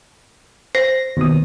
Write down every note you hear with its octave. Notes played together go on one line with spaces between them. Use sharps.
C5 A#6
D#2 B2 D#6